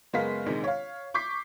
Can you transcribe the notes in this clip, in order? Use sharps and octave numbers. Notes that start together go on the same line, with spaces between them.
F#1 G#3 B3 A#4 F5 B6
A#1 C3 D#3 G#3
C#5 F5
C#6 D6 G6 B6 C7